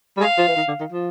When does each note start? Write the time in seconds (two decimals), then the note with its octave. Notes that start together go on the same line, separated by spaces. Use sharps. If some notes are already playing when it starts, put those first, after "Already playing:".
0.17 G3
0.20 G#3 F5
0.38 F3
0.48 E3
0.56 D#3
0.68 D3
0.80 D#3
0.92 F3